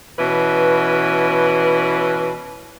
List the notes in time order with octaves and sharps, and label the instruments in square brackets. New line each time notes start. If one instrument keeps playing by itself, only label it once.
[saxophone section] B2 E3 C#4 B4